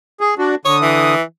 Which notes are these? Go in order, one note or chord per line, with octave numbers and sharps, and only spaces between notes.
G#4
D4 F#4
D3 C#5 D#6
E3